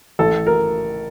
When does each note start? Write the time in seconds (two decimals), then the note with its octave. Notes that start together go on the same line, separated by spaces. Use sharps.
0.19 A1 A4
0.47 A#4